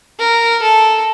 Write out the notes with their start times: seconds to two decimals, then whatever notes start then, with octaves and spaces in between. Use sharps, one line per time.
0.19 A#4
0.62 A4